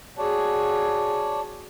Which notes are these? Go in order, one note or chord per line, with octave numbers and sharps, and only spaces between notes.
F#4 G#4 C#5 D5 A5